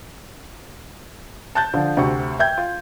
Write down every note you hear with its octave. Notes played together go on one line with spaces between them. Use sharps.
A5 F#6 G6 A6
D3 F3
D2 C3 F#4 C#6
E5 G5 G6 G#6
F4